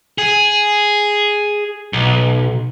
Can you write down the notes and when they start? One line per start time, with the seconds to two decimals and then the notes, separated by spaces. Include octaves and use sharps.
0.18 G#4
1.93 B1